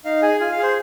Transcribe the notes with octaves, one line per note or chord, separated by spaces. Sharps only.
D#4 F5
G#4 G#5
F4 G#5
F5
G#4
C5